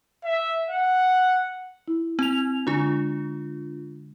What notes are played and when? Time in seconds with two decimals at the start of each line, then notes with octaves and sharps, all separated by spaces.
0.24 E5
0.70 F#5
1.88 E4
2.19 C4 F7
2.67 D3 G#3 D4 F4 G#5